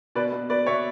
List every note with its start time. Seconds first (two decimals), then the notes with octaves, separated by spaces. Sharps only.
0.15 B2 B4 D5
0.32 B2
0.49 B2 B4 D5
0.67 B2 C#5 E5